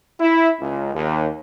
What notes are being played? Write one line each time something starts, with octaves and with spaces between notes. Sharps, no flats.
E4
C#2
D#2